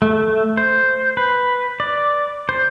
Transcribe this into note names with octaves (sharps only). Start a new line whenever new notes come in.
A3
C5
B4
D5
C5